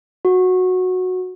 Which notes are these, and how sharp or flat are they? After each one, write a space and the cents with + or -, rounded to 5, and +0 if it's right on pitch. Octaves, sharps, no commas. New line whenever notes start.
F#4 -10